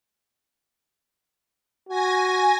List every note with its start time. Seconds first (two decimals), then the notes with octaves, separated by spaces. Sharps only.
1.89 F#4 G#5 A#6